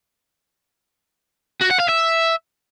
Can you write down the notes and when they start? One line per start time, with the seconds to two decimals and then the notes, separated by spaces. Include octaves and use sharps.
1.62 F#4
1.71 F#5
1.80 F5
1.89 E5